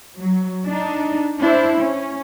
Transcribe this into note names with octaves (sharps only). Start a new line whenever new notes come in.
F#3
D4 D#4
D4 E4 C5
C#4